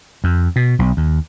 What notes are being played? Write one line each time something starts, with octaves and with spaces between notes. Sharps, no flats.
F2
B2
B1
D#2